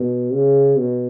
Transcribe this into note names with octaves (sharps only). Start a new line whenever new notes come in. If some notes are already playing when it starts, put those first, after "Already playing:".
Already playing: B2
C#3
B2